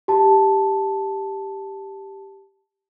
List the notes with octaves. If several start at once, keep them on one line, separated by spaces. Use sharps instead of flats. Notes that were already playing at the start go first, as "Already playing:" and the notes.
G4 A5